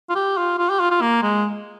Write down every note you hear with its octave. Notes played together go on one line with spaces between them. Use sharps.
F4
G4
F4
F4
G4
F4
F4
A#3
G#3